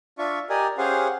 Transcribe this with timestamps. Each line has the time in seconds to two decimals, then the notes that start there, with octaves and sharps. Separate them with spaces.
0.18 D4 F4 E5 C#6
0.50 G4 A#4 D5 D#5 G#5
0.78 C#4 G4 G#4 C5 F5 F#5